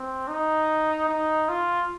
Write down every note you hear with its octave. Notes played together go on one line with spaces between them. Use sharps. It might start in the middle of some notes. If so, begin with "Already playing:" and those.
Already playing: C4
D#4
D#4
F4